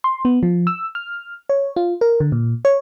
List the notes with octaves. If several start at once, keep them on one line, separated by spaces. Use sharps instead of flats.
C6
B3
F3
E6
F6
C#5
F4
A#4
D3
A#2
C#5